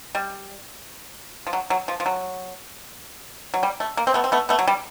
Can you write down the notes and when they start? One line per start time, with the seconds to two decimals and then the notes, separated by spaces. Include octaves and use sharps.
0.15 G3
1.47 F3
1.53 F#3
1.70 F#3
1.88 F3
2.00 F3
2.06 F#3
3.54 F#3
3.63 G3
3.80 A3
3.97 A#3
4.07 C4
4.14 A3 B3
4.24 C4
4.32 A3 B3
4.49 A3 B3
4.59 F#3
4.67 G3